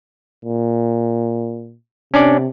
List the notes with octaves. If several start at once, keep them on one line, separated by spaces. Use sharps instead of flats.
A#2
C3 C#4 D4 D5